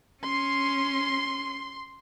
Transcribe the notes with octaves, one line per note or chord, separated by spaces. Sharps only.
C#4 C6 C7